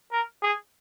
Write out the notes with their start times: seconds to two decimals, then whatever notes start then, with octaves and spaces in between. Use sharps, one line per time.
0.12 A#4
0.43 G#4